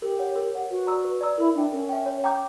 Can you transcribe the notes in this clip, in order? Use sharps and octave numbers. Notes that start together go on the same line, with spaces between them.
G4 A#4
C#5 F#5
A#4
C#5 F#5
F#4 B4
D5 A#5 E6
B4
D5 A#5 E6
E4 A#4
D4 E5 G5
C#4 A#4
E5 G5
C#5
G5 A#5 D6 G6